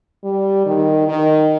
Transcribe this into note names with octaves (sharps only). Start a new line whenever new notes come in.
G3
D#3
D#3